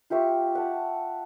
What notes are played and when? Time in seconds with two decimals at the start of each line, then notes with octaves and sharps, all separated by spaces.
0.10 F4 G4 E5 C#6
0.55 F#5 A5